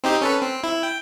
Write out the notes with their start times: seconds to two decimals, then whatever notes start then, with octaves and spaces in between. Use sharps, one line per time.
0.04 C4 D#4 G4
0.21 C#4 A4 B4
0.41 C4
0.64 E4
0.83 G5